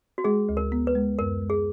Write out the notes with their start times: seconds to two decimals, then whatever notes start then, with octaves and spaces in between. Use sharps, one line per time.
0.18 F#4
0.24 G#3 G#4
0.49 D2
0.57 A#4
0.72 B3
0.87 B4
0.95 G#3
1.19 F#2 A#4
1.42 G#3
1.50 G#4